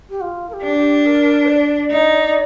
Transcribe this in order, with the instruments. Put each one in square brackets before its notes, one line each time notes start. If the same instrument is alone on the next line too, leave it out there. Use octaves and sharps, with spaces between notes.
[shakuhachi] G4
F4
A#4
G4
[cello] D4
[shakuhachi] G4
A#4
D5
[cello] D#4